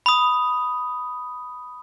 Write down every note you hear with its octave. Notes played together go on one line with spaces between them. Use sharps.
B5 D#6